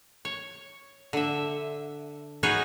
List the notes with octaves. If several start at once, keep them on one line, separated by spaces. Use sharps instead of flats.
C#5
D3 E5
C#4 D#4 F#4 G#4 B4 C#5